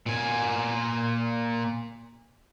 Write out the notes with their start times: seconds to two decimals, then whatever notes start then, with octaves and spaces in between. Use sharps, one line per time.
0.06 A#2 G#5